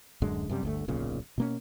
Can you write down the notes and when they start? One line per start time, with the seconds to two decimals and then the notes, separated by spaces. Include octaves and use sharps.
0.22 D1 F#2 D3 G#3
0.49 F#2 C3 G3
0.63 G1 D2 A3
0.88 D1 B1 A#2 C#3
1.38 B2 A#3 C#4